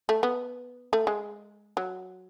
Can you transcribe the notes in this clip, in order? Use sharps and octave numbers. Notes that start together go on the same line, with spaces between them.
A3
B3
A3
G#3
F#3